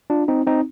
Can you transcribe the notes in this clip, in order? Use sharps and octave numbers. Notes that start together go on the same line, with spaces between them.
D4 F4
C4 D#4
C4 D#4